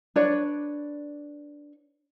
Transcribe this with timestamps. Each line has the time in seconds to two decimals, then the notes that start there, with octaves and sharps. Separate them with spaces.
0.16 D4 B4 C#5 D5